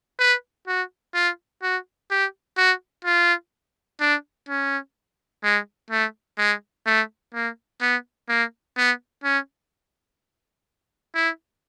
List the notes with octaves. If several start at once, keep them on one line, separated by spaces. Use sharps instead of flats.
B4
F#4
F4
F#4
G4
F#4
F4
D4
C#4
G#3
A3
G#3
A3
A#3
B3
A#3
B3
C#4
E4